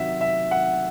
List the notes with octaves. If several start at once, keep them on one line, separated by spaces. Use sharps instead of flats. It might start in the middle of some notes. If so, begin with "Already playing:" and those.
Already playing: C3 D#3 F#3 E5 F#5
E5
F#5